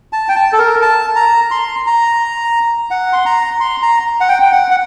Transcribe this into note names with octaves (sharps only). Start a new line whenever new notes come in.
A5
G5
A5
A4
A#4
A5
A#5
C6
A#5
F#5
C6
A#5
C6
A#5
F#5
G5
G5
F#5
F#5